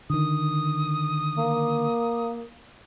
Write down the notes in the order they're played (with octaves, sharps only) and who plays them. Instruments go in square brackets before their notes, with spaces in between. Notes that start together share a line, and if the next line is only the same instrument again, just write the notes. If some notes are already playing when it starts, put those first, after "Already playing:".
[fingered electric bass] D3 D#3 [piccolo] D#6
[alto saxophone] A#3